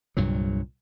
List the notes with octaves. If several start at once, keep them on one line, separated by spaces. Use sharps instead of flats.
C2 G2 A#2 F#3